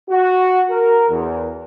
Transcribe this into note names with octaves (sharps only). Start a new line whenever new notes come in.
F#4
A#4
E2